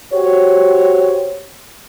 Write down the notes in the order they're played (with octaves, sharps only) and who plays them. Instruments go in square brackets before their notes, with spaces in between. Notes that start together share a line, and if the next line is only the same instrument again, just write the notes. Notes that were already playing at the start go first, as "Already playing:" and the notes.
[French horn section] F#4 G4 C5 C#5